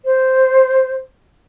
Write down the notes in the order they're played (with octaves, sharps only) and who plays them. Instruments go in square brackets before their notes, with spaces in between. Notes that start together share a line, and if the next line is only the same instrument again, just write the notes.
[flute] C5